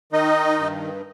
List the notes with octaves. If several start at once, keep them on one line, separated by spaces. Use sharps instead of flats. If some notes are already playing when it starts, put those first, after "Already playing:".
D#3 D#4 D#5
G2